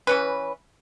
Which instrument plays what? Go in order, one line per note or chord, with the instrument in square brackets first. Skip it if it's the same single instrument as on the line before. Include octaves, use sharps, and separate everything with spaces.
[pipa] E3 C#4 B4